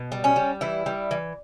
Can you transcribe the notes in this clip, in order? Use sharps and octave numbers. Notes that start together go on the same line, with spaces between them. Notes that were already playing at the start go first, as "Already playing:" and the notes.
Already playing: B2
G3
C#4
G3
E3 E4
G3
E3